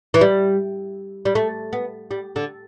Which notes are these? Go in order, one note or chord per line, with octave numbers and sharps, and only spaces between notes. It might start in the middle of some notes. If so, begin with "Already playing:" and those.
E3
G3
G3
A3
B3
G3
D3